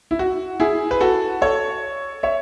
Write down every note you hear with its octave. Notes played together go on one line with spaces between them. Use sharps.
E4
F#4
E4 G#4
B4
F#4 A4
A4 C#5
C#5 E5